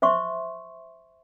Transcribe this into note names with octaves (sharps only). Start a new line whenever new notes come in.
C5 E5 C6 C#6